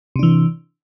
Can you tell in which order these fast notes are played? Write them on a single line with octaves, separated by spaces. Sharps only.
C3 D4 E3